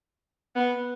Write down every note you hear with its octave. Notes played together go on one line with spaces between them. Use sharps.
B3